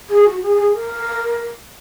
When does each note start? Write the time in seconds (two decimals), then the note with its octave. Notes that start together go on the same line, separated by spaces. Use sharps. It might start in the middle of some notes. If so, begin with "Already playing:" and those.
0.09 G#4
0.25 F#4
0.42 G#4
0.57 G#4
0.73 A#4